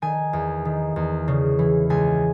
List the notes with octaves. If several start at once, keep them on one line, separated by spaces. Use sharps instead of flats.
D#3 G#5
E2
D#3
E2
C#3
E3
C#2 G#5